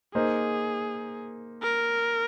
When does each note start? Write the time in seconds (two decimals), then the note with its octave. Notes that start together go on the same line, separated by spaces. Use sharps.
0.15 A#3 D#4 G#4 C5
1.62 A#4